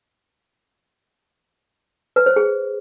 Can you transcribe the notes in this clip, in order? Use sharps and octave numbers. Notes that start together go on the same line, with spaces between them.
B4
C5
G#4